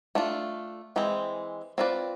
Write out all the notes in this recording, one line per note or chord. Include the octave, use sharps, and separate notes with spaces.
A3 D4 F4
E3 G#3 C4
C4 F4 B4 D5